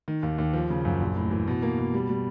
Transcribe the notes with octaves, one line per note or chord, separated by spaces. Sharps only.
D#3
D#2
D#2
F3
C#3
F#2
A#1
A2
E3
B2
A#3
B2
G3
G3